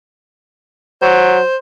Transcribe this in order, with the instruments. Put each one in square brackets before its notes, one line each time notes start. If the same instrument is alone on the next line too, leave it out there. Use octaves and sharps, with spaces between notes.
[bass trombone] F#3 [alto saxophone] C5